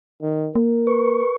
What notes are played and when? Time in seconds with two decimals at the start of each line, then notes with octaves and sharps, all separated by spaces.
0.21 D#3
0.55 A#3 A#4
0.87 B4 C#6